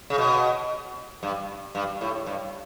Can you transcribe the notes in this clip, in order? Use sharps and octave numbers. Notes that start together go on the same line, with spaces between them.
C#3
B2
G2
G2
A2
G2